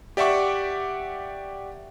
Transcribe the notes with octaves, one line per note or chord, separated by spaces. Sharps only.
G4 D5 E5 F#5 C#6 D6